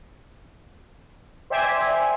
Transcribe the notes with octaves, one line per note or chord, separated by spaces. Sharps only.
C5 D5 E5 G5 G#5